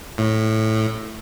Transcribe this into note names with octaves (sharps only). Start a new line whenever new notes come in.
A2